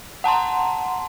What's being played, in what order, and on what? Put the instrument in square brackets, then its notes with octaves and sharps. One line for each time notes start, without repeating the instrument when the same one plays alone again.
[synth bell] F#5 A5 A#5 C6